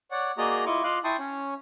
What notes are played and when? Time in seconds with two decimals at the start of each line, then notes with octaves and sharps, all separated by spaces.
0.11 C#5 D5 F#5
0.38 A#3 F#4 G#4 D5 D#5 A#5
0.66 E4 F4 D#5 C#6 D6
0.84 F4 D#5 F5 D6 F#6
1.04 E4 G5 A5 C6 C#6 D#6
1.19 C#4 C#5